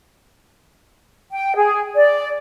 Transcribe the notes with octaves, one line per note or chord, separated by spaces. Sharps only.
G5
G#4
D5